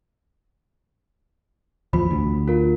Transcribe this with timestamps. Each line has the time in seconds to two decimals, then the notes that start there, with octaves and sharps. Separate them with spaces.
1.93 D1 E2 F3 B5
2.11 D2
2.48 F4 A#4